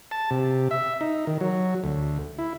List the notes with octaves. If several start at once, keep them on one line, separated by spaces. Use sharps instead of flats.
A5
C3
E5
D#4
D#3
F#3
D2
E4